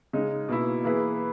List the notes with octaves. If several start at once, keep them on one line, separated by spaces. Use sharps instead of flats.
C#3 G#3 D#4
B2 A#3 E4
E3 A#3 E4 G#4 B4